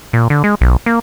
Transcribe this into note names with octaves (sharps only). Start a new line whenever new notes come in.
A#2
D3
G#3
B1
A#3